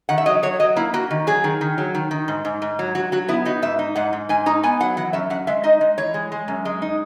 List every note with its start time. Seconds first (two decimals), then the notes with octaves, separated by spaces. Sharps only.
0.09 D#3 F#5
0.18 E5
0.26 F#3 D#5
0.43 F#3 C#5
0.60 F#3 D#5
0.76 A#3 E4
0.94 A#3 F#4
1.11 D#3
1.27 F#3 G#4
1.44 D#3
1.61 D#3
1.78 F#3
1.95 D#3
2.11 D#3
2.28 G#2
2.45 G#2
2.62 G#2
2.79 F#3
2.95 F#3 F#4
3.12 F#3 F#4
3.28 B3 E4
3.45 D#4 F#4
3.62 G#2 E5
3.79 D#4
3.95 G#2 F#5
4.13 G#2
4.29 G#2 G#5
4.46 D#4 A#5
4.63 B3 G#5
4.80 F#3 F#5
4.97 E3 F#5
5.13 F#2 E5
5.30 F#2 F#5
5.47 G#3 E5
5.64 D#4 D#5
5.81 G#3
5.98 E3 C#5
6.14 G#3
6.32 G#3
6.48 F#2
6.65 G#3
6.82 D#4